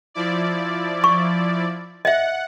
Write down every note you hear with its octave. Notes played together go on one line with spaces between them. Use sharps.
F3 E4 D5
C#6
D#5 E5 F#5